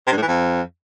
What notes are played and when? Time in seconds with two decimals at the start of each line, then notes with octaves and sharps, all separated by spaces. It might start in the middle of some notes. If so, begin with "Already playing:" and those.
0.07 C3
0.12 G2
0.17 A2
0.22 E3
0.27 F2